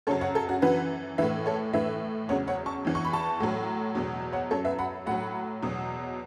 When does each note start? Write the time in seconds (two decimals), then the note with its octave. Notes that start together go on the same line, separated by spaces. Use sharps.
0.07 F#2 C#3 F#3 A4 C#5
0.21 C#5 F#5
0.35 A4
0.49 F#4
0.62 F#2 E3 F#4 B4
1.18 A2 E3 B4 E5
1.46 A4 C#5
1.73 A2 E3 B4 E5
2.29 E2 C#3 F#3 C#5 F#5
2.47 C#5 F#5
2.66 A5 C#6
2.85 E2 E3
2.95 C#6
3.05 B5
3.13 A5 C#6
3.40 A2 F#3
3.95 E2 B2 F#3
4.33 C#5 F#5
4.51 F#2 F#3 A4 C#5
4.65 B4 E5
4.79 F#5 B5
5.06 A2 F#3 F#5 B5
5.62 E2 B2 F#3